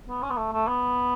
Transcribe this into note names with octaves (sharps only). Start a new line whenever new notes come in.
B3
C#4
B3
A3
A3
B3